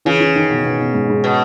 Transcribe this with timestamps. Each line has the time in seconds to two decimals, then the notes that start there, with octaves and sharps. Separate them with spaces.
0.05 C#3 E3
0.20 E3
0.36 D#3
0.50 B2
0.64 B2
0.80 B2
0.94 G#2
1.10 G#2
1.24 B2